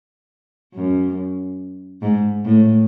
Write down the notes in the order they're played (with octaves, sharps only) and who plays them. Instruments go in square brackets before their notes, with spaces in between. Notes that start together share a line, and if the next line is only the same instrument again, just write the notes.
[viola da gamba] F#2
G#2
A2